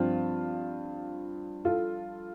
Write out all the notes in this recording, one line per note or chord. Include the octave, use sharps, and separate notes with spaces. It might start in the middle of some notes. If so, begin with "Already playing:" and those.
Already playing: G2 F3 C4 F4
F4 A4